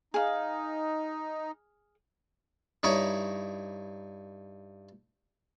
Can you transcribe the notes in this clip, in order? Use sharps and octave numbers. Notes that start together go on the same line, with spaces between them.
D#4 G#4 F5
G2 D#4 E4 C#5 A#5